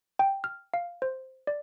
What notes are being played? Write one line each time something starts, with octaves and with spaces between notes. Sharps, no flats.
G5
F6
F5
C5
D5